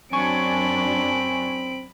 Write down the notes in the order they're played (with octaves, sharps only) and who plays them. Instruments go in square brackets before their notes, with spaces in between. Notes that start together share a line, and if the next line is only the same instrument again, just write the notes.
[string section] F#2 D4 [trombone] C4 [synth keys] G#5 C#6 [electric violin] B5 D7